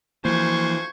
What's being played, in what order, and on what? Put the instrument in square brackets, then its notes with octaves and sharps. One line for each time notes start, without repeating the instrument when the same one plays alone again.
[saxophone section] D2 F4 C5 [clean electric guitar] E3 [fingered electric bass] F3 A#3 [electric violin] C#6 G#6